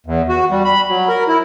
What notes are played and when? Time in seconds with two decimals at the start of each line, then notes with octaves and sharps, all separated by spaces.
0.06 E2
0.29 F#4
0.51 G3
0.65 B5
0.89 F#3
1.09 A#4
1.28 E4